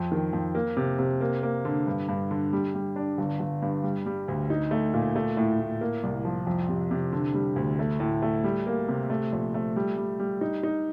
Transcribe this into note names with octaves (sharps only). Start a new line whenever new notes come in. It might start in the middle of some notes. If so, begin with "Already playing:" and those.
Already playing: F2
D#3
F2
A#3
C3
C3
A#3
A#3
D3
G2
G2
D3
G3
G3
D4
G1
G1
G2
G3
G3
D2
D#4
A3
A#2
A3
A2
A2
A#3
C2
F3
F2
C3
C3
D3
G3
D2
A3
A2
A3
G3
A#3
C3
A3
A#1
A3
G3
G3
G3
D#4
D#4